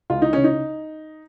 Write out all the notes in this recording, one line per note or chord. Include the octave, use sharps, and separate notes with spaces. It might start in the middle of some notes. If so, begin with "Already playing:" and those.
C#2 F4
D#4
C#3 C#4
D#4